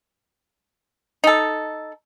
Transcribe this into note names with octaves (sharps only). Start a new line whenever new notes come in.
D#4 A4